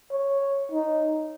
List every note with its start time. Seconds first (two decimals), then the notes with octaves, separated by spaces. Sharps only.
0.11 C#5
0.71 D#4